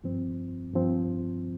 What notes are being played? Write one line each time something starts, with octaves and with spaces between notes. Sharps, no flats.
G2 F3 C4
G2 F3 C4